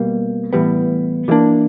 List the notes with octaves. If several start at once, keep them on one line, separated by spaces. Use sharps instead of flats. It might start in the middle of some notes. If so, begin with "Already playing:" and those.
Already playing: B2 G3 A#3
A2 E3 G3 B3
E3 G3 A#3 D4